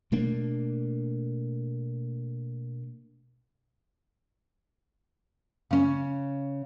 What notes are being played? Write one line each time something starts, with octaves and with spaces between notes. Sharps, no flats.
B2 A3 A#3 D4
C#3 C#4